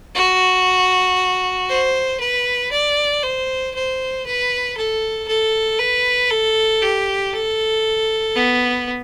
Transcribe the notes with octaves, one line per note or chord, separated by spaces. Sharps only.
F#4
C5
B4
D5
C5
C5
B4
A4
A4
B4
A4
G4
A4
B3